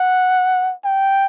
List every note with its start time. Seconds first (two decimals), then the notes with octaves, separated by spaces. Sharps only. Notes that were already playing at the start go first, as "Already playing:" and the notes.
Already playing: F#5
0.84 G5